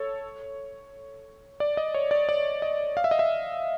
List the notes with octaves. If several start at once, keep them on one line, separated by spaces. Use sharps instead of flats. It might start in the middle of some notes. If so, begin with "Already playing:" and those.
Already playing: A4 C#5
D5
D#5
C#5
D5
D5
D#5
F5
E5
D#5
E5